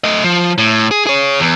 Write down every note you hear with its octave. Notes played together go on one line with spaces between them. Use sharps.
A3 D#5
F3
A2
G#4
G#4 C#5
E2